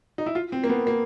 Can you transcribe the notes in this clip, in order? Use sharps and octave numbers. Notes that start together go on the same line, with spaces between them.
D#4
E4
F4
C4
A#3
B3
A#3